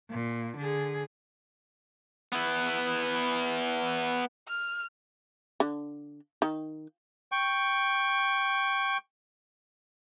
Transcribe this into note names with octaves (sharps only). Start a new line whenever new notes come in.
A#2
D3 G#4
B3 E4
F6
D3
D#3
G5 C#6